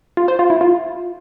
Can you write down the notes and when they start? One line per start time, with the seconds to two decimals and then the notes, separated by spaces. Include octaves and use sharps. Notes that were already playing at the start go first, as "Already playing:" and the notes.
0.17 F4
0.28 C5
0.39 F4
0.50 E4
0.61 F4